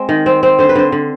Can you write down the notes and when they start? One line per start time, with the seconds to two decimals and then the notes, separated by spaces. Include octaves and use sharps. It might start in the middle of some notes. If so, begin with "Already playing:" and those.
Already playing: G#3 C4
0.09 D#3
0.26 C4
0.43 C4
0.59 D3 C5
0.69 B4
0.75 D3 C5
0.92 D3